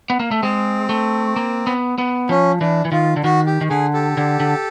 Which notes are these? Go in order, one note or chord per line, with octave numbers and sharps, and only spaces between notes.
B3
A#3
A3
G#3 C4
A3
A#3
B3
B3
F3 C#4
E3 D4
E3
D#3 F4
D3
D#3 F#4
G4
D#3
D3 G#4
G4 A4
D3
D3